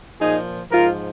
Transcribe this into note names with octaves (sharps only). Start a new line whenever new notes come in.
A#2 F3 D#4 G#4
G#2 F3 F4 A#4